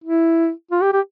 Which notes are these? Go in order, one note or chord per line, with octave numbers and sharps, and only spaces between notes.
E4
F4
G4
G4